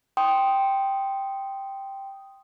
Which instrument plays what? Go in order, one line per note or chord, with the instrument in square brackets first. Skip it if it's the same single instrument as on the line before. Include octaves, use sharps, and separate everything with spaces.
[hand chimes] G5 C6 D#6